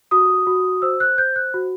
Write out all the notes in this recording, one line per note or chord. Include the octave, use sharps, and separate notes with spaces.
F#4 D#6
F#4
C5 E6
F#6
C5 G6
F#6
F#4